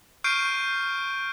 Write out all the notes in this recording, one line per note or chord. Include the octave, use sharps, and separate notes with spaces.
C#6 F6 G6 C7 D7 D#7